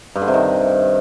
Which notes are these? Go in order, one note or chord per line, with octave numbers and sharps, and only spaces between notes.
G2
D3
C3
D#3